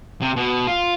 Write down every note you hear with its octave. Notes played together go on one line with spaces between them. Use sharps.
C3
B2
F4